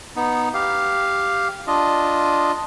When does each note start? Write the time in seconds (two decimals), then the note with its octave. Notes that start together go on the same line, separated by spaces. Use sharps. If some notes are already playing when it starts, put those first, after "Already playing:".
0.16 B3 D#4
0.54 G4 F5
1.67 D4 F4 D#5